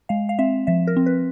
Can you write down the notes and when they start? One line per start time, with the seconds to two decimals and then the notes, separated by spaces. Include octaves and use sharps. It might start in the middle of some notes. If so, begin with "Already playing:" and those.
0.09 G#3 F5
0.29 F5
0.39 C4 E5
0.67 F3 E5
0.87 A#4
0.96 C4
1.06 B4